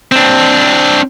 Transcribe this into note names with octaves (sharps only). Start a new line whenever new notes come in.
C4 D4